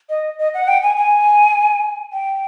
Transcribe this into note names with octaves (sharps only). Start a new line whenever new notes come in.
D#5
D#5
F#5
G5
G#5
G#5
G5